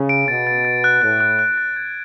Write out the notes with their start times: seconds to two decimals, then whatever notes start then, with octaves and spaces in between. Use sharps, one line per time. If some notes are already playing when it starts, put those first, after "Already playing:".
Already playing: C#3
0.09 D7
0.28 B2 A6
0.47 A6
0.65 A6
0.84 F#6
1.02 A2 F#6
1.21 F#6
1.39 F#6
1.58 A6
1.76 G#6